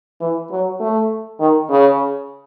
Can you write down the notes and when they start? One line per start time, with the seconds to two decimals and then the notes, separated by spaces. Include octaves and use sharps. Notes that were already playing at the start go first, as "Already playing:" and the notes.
0.21 E3
0.51 F#3
0.80 A3
1.40 D#3
1.69 C#3